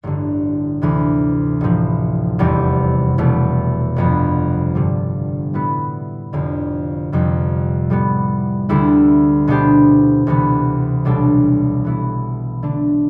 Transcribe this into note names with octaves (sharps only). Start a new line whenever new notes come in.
A1 G2 D3
D2 C3 E3
A1 A2 F3
F1 E2 C3 G3 C4
E1 E2 B2 A3
G1 F2 C3 F3 B3
G2 D3 G3
A2 G3 B3 E4 B4
F1 F2 D3
F1 F2 C3 G3
A2 G3 B3
D2 D3 G3 B3 E4
B2 B3 D4 G4 C5
D2 C3 E3 B3
B1 B2 G3 D4 A4
E3 B3 E4
D3 A3 D4